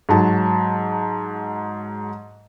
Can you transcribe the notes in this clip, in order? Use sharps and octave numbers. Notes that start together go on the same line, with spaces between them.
G#2 F#3 A5